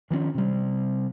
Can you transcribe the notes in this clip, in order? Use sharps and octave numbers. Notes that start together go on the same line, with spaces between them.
D#3 F3 A#3 C#4
C3 G3